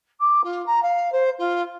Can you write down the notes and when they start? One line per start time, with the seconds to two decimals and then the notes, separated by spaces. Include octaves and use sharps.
0.20 D6
0.43 F4
0.66 A#5
0.82 F5
1.12 C5
1.38 F4